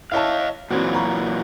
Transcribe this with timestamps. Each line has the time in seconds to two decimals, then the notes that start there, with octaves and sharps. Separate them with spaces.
0.12 E4 C#5 D#5 F5 A5
0.71 A#2 E3 F#3 C4 F#4
0.94 A#5 B5 C#6